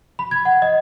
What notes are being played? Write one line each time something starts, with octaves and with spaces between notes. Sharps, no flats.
B5
G#6
F#5
D#5